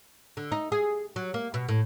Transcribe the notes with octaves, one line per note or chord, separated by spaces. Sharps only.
D3
D#4
G#4
F#3
A#3
B2
A2